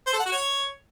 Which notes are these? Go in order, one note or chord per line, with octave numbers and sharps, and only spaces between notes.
C5
A4
F#5
F#4
C#5